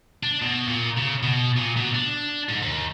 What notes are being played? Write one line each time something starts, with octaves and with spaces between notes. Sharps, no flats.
D4
B2
A#2
C#3
B2
A#2
B2
D4
G#2
D#2